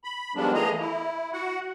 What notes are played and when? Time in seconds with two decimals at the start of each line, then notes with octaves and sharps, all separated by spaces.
0.04 B5
0.36 D#3 F3 G3 G#3 B3 D4
0.54 E3 A3 A#3 G#4 D#5 A#5
0.80 E4
1.33 F#4 F#5